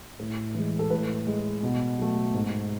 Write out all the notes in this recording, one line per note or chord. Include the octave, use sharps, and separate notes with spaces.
A2
E3 G#3
A4
A2 B4
G#3
B2
F#3 A3
G#2